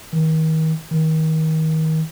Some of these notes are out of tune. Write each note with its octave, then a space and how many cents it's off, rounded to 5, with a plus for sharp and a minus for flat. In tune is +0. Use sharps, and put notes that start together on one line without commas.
D#3 +35
D#3 +30